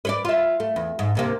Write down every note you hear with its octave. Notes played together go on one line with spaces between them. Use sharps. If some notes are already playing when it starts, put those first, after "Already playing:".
B4 C#5 D5
F4 E5
A3
E2
G#2
D2 C3 A#3